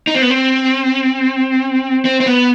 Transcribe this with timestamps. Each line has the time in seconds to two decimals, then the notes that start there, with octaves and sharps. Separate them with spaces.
0.07 D#4
0.15 C4
0.22 B3
0.30 C4
2.05 C4
2.20 C4
2.27 B3